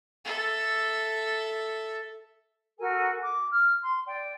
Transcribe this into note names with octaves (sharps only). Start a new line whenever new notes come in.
A4 E5
F#4 A4 A#4 G#5
D6
F6
C6
D5 G5